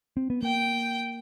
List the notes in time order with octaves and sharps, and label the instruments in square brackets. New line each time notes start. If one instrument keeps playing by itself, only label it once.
[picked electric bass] C4
B3
[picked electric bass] A#3 [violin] G5